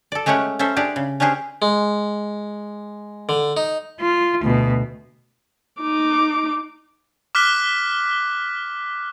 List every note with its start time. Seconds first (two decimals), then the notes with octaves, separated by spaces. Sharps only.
0.12 A4 D5
0.26 G#3 A3 C#4 G4 C#5 F#5
0.59 C#4 A4 C5 E5
0.76 D4 G4 G#4 D5
0.96 C#3
1.20 C#4 D4 G4 G#4 C5
1.62 G#3
3.29 D3
3.57 D#4
4.01 F4
4.42 D2 B2
5.81 D#4 D6
7.35 D6 F6 F#6 B6 G7